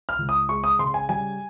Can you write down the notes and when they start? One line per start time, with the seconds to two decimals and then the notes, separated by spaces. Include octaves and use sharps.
0.09 F6
0.18 C#2
0.29 D#6
0.49 G#3 C#6
0.64 D#6
0.79 C#3 C6
0.94 G#5
1.09 G3 G#5